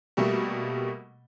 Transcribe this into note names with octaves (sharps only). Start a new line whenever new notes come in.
B2 G3 A3 A#3